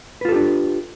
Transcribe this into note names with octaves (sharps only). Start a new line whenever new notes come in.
D4 F4 G4 A4 B4